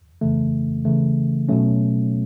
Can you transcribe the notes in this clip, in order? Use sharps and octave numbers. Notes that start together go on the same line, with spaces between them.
F2 C#3 E3 A3
C#3 E3 A3
B2 F#3 A3 C#4